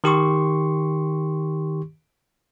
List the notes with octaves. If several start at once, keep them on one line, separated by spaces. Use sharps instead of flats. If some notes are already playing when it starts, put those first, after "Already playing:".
D#3 G4 C6 C#6